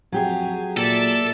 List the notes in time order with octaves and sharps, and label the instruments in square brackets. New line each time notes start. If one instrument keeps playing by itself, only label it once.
[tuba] F2 [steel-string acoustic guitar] F#3 G4 G#4
[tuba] A#2 [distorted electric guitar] A4 [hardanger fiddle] D5 E5